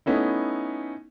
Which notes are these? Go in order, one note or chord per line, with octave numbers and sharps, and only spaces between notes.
A3 B3 C#4 D#4 E4